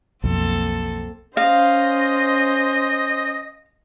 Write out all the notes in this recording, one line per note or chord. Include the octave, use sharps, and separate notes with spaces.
B1 F2 A#3 C4 A4
C#4 C5 D#5 F5